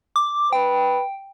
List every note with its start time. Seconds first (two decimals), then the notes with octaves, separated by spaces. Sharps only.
0.16 D6
0.53 B4 G5